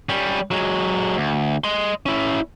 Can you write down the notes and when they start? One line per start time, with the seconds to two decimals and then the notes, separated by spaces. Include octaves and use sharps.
0.09 G3 C#4
0.51 F#3 G#3
1.17 D2
1.64 D#5 C6
2.06 C#4 E4